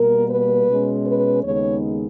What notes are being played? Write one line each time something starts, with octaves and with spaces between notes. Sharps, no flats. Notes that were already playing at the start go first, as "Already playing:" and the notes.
Already playing: B2 G3 A#3 A#4
B4
B2 G#3 C#4
B4
D#2 C#3 G#3 B3 D#4 C#5